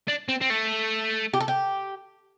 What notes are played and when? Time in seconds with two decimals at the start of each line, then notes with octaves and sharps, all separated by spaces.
0.08 D4
0.29 C4
0.41 C4
0.50 A3
1.34 G4
1.40 A4
1.48 G4